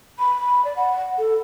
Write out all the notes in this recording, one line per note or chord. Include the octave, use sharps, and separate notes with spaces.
B5
D5
F#5
A4